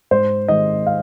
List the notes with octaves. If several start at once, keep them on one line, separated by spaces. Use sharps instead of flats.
G#2 C5
D#3 G#3 D#5
F5